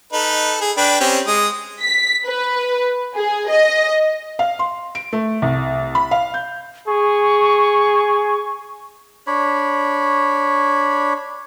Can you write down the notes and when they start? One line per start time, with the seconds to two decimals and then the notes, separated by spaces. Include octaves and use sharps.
0.13 D#4 A4 B4
0.61 G#4
0.77 D4 B4 G5
1.01 C4 C#4 G4
1.27 G#3 D#6
1.82 B6
2.27 B4
3.16 G#4
3.50 D#5
4.39 F5
4.59 C6
4.95 D7
5.13 A3
5.42 C2
5.95 B5
6.11 F5
6.34 G6
6.87 G#4 C#6
9.27 D4 C#5 B5